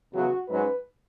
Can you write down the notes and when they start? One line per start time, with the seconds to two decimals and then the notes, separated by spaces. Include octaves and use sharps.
0.13 E2 C#3 F#3 B3 F#4
0.48 G#2 F#3 C#4 B4